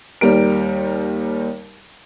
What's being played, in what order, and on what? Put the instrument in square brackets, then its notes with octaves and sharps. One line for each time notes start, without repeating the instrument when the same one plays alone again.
[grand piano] D#2 G3 A#4 D7